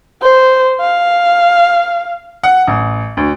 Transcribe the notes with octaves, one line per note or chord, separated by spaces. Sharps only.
C5
F5
F#5
A1
D2